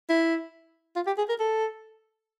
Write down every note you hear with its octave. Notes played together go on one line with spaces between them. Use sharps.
E4
F4
G4
G#4
A#4
A4